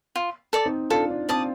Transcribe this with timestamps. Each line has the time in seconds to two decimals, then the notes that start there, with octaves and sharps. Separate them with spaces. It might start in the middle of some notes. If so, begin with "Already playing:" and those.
0.16 F4
0.53 A4 D5
0.66 C4 D#4
0.90 D4 F4 A4
1.10 D4
1.29 C4 D5 A5 D#6